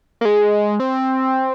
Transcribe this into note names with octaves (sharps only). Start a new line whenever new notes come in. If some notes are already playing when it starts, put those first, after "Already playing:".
A#3
G#3
C4